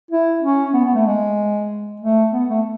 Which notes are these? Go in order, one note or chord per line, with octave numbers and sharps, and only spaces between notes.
E4
C#4
B3
B3
A3
G#3
A3
B3
A3